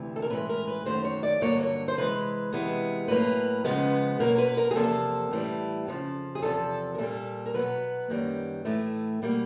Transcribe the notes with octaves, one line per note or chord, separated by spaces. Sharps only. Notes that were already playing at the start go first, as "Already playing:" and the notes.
Already playing: D2 C3 E3
A4
A#4
A2 E3 G#3 B4
A#4
B4
F#2 D#3 F#3 A3 C5
C#5
D5
G2 D3 F#3 A#3 C#5
C#5
C5
C3 E3 G#3 B4
C3 E3 G#3 B3
A2 F#3 A#3 B4
F2 C#3 F3 G#3 B3
B2 F#3 A#3 A#4
B4
A#4
G#4
E2 C3 F3 A#3 A4
A2 E3 G3
F2 C#3 F3
G#4
E2 C3 F3 A4
A#4
A#2 G3 A#3 A4
A#4
B2 F#3 B3 B4
F#2 D#3 G3 A#3
A2 E3 A3
B2 G3 A#3